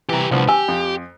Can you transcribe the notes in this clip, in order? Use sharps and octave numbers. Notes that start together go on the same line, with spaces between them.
C2 E3 G4 A#5
C2 D3 F3 B3
G4 G#5 E6
F2